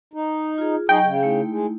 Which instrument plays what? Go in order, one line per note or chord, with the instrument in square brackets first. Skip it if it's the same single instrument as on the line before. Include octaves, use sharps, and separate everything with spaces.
[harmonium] D#4
[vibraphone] F4 G#4
[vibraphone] F#3 D#5 C#6 [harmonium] D#4 G#4 [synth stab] G5
[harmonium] C#3 [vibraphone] G#4
[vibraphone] A3 D#4 E4
[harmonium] G#3